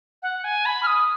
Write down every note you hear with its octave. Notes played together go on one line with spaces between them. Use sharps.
F#5
G#5
B5
F6
D#6